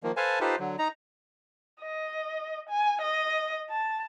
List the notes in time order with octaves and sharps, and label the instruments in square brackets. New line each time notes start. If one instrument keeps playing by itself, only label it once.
[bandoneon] D#3 F3 A#3
A4 B4 C5 F5 G#5 A5
D#4 F4 G4 A4 B4 C5
D3 F#3
D#4 A#5
[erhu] D#5
G#5
D#5
A5